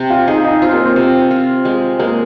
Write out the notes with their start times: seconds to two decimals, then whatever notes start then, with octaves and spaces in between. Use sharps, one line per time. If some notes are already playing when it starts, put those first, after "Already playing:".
Already playing: C3
0.10 F4
0.28 D#4 G#4
0.44 D#4
0.62 C4 F4
0.74 A#3
0.86 C4
0.96 C3
1.31 F4
1.65 G#3
1.99 G#3 A#3